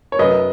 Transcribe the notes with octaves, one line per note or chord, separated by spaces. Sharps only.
C#5
F#2 B4 D#5